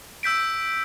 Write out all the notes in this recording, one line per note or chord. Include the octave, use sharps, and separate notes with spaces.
E6 G6 B6 D7